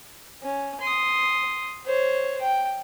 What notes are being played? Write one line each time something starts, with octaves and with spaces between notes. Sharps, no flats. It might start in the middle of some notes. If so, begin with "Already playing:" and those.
C#4
C6 D#6
C5 C#5
G5